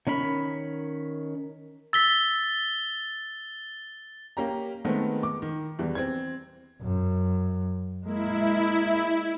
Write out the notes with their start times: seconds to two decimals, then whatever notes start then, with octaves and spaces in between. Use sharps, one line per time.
0.07 D#3 C#4 A#4 B5
1.93 E6 A6 B6 G7
4.37 A#3 C#4 G4 A#5
4.84 D#3 G#3 A3 B3 C4 A#4
5.23 D6
5.42 D#3
5.79 E2 E3 G3
5.95 C4 G#6
6.82 F#2
8.06 G#3 A#3 E4